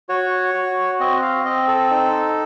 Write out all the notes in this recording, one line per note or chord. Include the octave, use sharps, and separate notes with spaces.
F#4 C#5
F#4
C4 D#5
F5
C4 D#5
A4
D#4